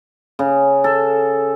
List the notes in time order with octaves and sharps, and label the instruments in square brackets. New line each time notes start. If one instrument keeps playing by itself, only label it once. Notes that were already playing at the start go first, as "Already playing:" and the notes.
[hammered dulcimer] C#3
A4